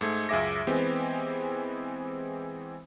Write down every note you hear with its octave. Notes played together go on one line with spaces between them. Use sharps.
G#2 A3 G#6
C#2 F#2 G#4 E5 D6 A#6
E3 G#3 B3 C4 G4